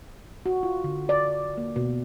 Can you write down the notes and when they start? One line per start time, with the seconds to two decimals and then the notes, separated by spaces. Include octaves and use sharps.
0.46 F#4
0.63 F4
0.84 D3
1.09 D5
1.57 A#3
1.76 B2